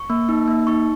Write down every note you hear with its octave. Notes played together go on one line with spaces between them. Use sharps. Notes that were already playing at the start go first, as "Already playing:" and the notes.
Already playing: C#6
A#3
D#4
A#3
D#4 C#6